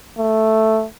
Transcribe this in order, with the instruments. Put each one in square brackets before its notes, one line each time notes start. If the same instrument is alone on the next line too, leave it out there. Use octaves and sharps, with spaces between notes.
[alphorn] A3